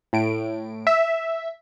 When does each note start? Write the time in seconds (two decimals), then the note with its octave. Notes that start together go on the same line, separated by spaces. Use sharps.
0.13 A2 D7
0.87 E5